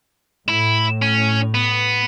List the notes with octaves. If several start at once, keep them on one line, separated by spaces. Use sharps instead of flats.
A2 E4
C#4
B3